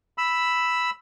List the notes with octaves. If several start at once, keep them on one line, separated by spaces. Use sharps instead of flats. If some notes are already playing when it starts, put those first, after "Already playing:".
B5 E6